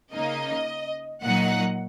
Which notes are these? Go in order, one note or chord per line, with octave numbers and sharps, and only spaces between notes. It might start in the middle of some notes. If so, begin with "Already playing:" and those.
C#3 A#3 D#4 D#5
A#2 F#3 D#4 F#5